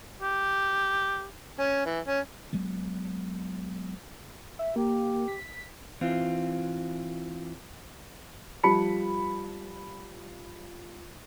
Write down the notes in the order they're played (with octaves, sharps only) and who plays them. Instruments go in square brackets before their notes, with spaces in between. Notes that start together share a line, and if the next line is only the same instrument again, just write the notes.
[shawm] G4
[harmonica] C#4
E3
C#4
[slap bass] F#3 G#3 B3
[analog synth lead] E5
[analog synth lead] A#3 [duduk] G4
[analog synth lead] B6
[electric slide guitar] E3 C4 F4
[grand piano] F3 G3 A5 B5 C#7